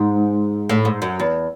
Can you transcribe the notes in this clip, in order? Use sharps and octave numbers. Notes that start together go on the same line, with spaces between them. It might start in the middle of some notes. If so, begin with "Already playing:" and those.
Already playing: G#2
A2
G#2
F#2
E2